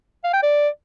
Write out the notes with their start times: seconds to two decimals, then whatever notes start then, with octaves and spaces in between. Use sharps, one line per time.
0.24 F5
0.33 G5
0.43 D5